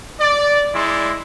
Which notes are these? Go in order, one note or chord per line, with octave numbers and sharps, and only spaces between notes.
D5
G#3 E4 D5 C6